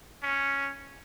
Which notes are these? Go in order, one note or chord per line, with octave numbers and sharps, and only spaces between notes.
C#4